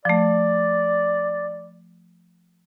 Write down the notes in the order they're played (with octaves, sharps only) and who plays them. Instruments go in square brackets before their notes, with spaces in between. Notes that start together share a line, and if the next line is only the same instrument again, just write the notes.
[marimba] F3 A3 [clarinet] D5